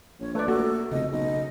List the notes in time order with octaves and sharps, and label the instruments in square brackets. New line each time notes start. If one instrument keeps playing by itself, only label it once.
[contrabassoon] A#1 [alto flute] C#5
[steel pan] A3 D5 [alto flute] B4
[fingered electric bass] A#3 [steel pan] F#4 [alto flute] A4
[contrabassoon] F1 [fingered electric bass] C#3 [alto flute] D#5
[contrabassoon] B1 [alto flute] D#5